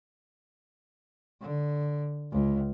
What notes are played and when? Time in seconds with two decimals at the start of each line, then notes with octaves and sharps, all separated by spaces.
1.41 D3
2.32 C#2